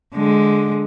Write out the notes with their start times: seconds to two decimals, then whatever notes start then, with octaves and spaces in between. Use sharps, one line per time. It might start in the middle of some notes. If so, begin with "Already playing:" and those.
0.14 D3 G#3